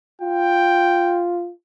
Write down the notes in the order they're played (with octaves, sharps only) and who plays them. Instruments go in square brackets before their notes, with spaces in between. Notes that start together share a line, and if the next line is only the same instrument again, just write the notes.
[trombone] F4 [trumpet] G5